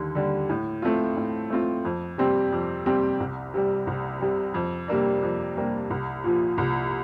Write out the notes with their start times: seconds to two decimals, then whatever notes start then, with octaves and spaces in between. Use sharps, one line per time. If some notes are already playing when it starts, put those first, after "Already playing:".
Already playing: D#2 D3 G3
0.15 D3 G3
0.50 A2
0.82 A3 C4 F4
1.17 A2
1.50 A3 C4 F4
1.85 F2
2.18 C3 G3 C4 G4
2.52 F2
2.86 C3 G3 C4 G4
3.20 C2
3.54 C3 G3
3.87 C2
4.20 C3 G3
4.54 F2
4.88 C3 G3 A#3 D4
5.23 F2
5.57 C3 G3 A#3 D4
5.90 C2
6.24 A#2 F3
6.58 C2